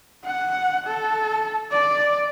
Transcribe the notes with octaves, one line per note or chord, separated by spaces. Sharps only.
F#5
A4
D5